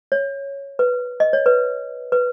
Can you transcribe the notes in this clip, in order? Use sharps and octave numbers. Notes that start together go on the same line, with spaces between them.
C#5
B4
D#5
C#5
B4
B4